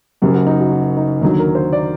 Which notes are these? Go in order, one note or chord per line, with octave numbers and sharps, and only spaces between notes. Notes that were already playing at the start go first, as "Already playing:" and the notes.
F#1 F#2 F#3 G4
F#4
D#4
F#4
F#4
D#4
D#2 D3 F#3 D#4
A#4
C5
D5